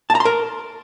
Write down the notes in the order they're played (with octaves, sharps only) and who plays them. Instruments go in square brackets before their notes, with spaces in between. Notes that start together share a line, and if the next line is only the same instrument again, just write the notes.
[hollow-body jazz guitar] A5
A#5
C6
A#4